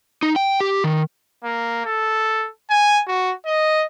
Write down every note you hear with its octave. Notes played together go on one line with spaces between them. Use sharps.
D#4
G5
G4
D#3
A#3
A4
G#5
F#4
D#5